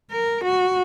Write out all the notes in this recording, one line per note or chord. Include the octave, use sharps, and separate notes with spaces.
A#4
F#4